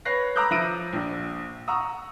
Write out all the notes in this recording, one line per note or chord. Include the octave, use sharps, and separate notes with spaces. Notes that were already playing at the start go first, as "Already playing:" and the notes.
B4 C#5 F#6 A#6 C7
A#5 B5 D6 E6 F#6 G6
F3 E5 E6 A#6 D7 D#7
A#1
F#5 A#5 C#6 D#6 E6